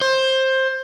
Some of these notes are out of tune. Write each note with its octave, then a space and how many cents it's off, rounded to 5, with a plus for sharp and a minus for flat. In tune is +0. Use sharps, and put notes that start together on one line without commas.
C5 +15